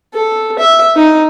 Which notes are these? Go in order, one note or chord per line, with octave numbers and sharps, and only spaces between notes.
A4
E5
D#4